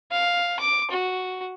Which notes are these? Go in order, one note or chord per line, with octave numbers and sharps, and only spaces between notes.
F5
D6
F#4